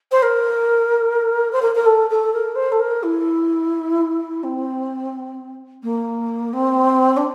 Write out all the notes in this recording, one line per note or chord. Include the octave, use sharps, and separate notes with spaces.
C5
A#4
C5
A#4
A#4
A4
A4
A#4
C5
A4
A#4
E4
C4
A#3
C4
D4